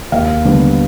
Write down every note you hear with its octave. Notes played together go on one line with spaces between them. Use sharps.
D#2 F5
D3 G3 B3